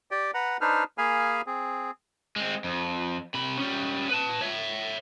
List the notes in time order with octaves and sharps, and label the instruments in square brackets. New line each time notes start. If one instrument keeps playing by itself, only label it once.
[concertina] G4 D5 G5
B4 F#5 A#5
D4 D#4 B4 C5 F6
A#3 G#4 F5 G#5 B5 F6
C4 G#4
[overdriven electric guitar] G#3 C4
F2
C3 B5
G3 C#4
B4 A5
C#5 E5